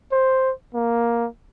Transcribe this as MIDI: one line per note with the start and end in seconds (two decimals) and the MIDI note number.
0.12 0.52 72
0.74 1.27 58